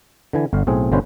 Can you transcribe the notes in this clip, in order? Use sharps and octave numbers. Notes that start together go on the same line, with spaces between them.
D3 E3 G#5
G1 D3 F5
B1 A2 C4 G#4
G1 B2 D3 C#4 B4 C5